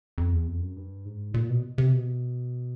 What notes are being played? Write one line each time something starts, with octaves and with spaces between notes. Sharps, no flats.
F2
E2
F2
F#2
G2
G#2
A#2
B2
C3
B2